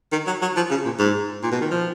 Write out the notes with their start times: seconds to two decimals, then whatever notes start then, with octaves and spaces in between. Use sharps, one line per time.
0.12 D#3
0.27 F#3
0.42 F#3
0.56 F3
0.70 C#3
0.85 A#2
0.99 G#2
1.43 A#2
1.52 B2
1.61 D#3
1.71 F3